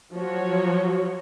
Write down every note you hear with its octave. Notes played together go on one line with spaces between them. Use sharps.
F3 F#3 F#4 C#5